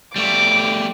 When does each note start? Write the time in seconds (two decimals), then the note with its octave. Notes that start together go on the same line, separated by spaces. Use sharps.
0.16 G3 A3 D6